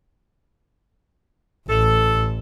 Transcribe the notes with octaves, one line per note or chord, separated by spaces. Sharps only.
A1 A4